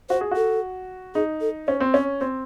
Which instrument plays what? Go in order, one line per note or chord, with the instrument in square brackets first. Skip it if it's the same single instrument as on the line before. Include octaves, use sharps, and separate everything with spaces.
[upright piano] F#4 [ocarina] C5
[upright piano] G#4
[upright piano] F#4 [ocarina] A4
[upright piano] D#4 [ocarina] G#4
[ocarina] A4
[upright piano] C#4 [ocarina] C5
[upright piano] C4
[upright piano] C#4 [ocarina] C#5
[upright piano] C4 [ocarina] C5